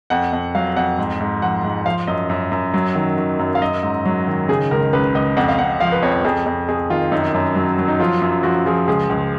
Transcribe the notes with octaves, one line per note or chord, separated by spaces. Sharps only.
F2 F#5
F2
F#3 F5
F2 F#5
G#2
G#2
F3 F#5
G#2
F3 F5
F#2 D#5
F#2
F#2
F#3
D#3
D#3
F#2
F5
F#3 D#5
G#2
F#3
D#3
C#3 G#4
C#2 A#4
C#2 B4
C#2 D#5
F2 F#5
F5
F2 F#5
F3 F5
B4
F2 C#5
F2 G#4
F2
F2 G#4
D#3 F4
F#2 D#4
F#2
F#3
F#3
D#4
F3 F4
F#2
F3 F#4
F3 G#4
C#2 G#4
C#2